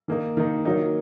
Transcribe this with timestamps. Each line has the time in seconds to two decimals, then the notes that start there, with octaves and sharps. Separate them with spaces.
0.08 D#3 A#3 D#4
0.37 D#3 A#3 D#4
0.65 D#3 F#3 A#3 D#4